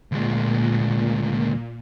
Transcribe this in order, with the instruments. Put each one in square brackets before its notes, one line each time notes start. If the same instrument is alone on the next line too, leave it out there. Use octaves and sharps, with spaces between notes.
[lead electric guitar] D2 G#3 [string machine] A#2